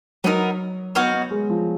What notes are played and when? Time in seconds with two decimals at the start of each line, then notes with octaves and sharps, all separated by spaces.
0.24 F#3 B3 D#4 A#4
0.95 B3 D#4 F#4 C#5 F5
1.13 B3
1.31 G#3
1.49 F3